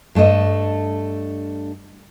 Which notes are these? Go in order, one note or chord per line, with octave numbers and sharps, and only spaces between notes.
G2 A3 D4 D#5